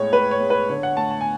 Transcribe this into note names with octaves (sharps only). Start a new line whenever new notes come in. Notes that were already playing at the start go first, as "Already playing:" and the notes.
Already playing: A2 G#3 C#5
A2 B4
C#5
G#3
B4
D3 C#5
F#5
A3 A5
A5
G#5